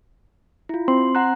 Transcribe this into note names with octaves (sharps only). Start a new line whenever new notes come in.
E4 F4
C4 C6
F#5 A#5 F#6